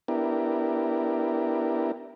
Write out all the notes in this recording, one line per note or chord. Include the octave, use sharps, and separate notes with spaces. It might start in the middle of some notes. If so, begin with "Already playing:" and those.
B3 D4 E4 G4 A#4